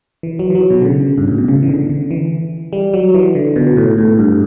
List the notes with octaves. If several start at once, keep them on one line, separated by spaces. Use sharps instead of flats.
E3
F#3
E3
F#3
B2
D3
C#3
G2
A2
B2
C#3
E3
D3
D3
E3
G3
F#3
E3
D3
B2
A2
A2
G2